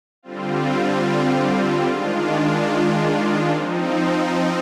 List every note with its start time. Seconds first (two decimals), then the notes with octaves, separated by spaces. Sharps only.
0.23 D3 G3 C4 F4
1.87 D#3 G#3 D4 F4
3.50 F3 C4 D#4